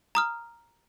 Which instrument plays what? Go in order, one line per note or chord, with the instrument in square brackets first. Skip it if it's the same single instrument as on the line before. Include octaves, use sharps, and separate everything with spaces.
[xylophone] A#5 D#6 F6